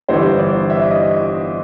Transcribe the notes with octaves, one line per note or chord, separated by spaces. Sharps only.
G1 G2 E3 G3 C5
D5
E5
D#5